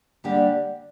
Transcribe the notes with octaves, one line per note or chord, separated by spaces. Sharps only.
D3 G3 A#3 D4 G4